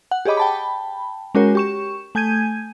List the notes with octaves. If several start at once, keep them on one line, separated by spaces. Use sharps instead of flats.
F#5
G4 G#4 C#5 D#5 B5 D6
G5 A5 B5
G#3 C#4 F#4 A#4 C#5
G4 C#6 E7
A3 G#5 G6 G#6 D#7